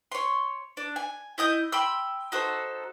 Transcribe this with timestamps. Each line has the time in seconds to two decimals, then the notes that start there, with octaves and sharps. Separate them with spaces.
0.12 C#5 C6
0.77 D4
0.96 G#5
1.38 E4 D#5 D#6 G6
1.72 G5 B5 C6 E6
2.32 D#4 F#4 A4 C5